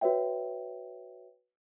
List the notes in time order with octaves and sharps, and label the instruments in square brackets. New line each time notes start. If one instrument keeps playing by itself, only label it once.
[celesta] F#4 B4 C#5 E5 G5